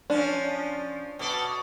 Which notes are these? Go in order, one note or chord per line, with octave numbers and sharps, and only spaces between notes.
F3 C#4 D4
B2 A4 D5